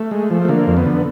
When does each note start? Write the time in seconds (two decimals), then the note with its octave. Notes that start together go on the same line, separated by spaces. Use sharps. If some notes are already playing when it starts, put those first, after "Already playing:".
Already playing: A3
0.11 G#3
0.30 F3
0.45 A3
0.48 D3 A#3
0.67 F2
0.77 B3
0.86 D3